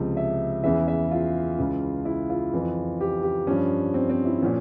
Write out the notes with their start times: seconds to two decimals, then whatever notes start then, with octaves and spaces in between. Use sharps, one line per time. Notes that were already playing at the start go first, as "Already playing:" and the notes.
Already playing: C#2 C3 F3
0.17 E5
0.63 E2 C#3 E3 E5
0.88 E5
1.11 F4
1.58 C#2 C#3 E3
2.05 E4
2.30 F4
2.53 F2 E3
3.01 G4
3.23 G4
3.47 G2 F3 C#4
3.94 C4
4.10 C4
4.25 E4
4.42 A#2 F3 C#4